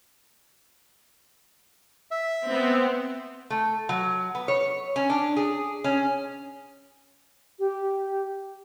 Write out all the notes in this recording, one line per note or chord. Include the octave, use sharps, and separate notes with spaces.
E5
B3 C4
A3
F#3
B3
C#5
C#4
D4
G#4
C#4
G4